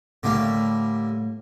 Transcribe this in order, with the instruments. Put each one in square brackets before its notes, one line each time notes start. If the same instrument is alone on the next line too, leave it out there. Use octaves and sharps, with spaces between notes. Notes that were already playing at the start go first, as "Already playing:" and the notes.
[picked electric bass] A2 A3 [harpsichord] D3 G3 A#3